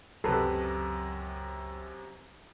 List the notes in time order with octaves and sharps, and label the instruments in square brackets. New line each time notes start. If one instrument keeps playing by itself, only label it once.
[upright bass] C#2 F#3 [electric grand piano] F#2 C3 [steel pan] A4 B4